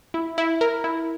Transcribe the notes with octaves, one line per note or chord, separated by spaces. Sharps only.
E4
E4
A#4
E4